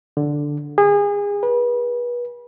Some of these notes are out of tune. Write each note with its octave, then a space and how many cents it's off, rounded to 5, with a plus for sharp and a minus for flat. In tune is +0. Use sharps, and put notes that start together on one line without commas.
D3 +0
G#4 -30
B4 -35